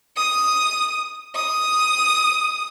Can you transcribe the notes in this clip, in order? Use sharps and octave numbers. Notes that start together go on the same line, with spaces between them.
D#6
D#6